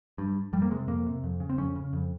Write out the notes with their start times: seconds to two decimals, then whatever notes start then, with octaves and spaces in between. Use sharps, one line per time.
0.18 G2
0.53 F2 G3
0.62 A#3
0.71 C3 G#3
0.88 F2 A#3
1.06 C3
1.24 F2
1.40 C#3
1.49 C4
1.58 F2 C#4
1.76 C#3
1.93 F2